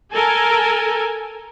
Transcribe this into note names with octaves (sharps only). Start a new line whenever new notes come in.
A4 A#4 G#5